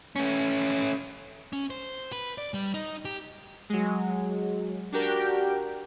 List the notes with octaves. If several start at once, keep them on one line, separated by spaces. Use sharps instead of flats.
A3 C#4
C#4
C5
B4
D5
G3
D#4
G4
F#3 G#3
D4 F#4 G4 A#4 G5